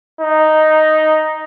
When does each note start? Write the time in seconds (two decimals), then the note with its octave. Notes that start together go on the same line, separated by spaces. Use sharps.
0.21 D#4